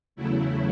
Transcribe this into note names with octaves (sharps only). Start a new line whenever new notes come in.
E2 C#3 F#3 A3 E4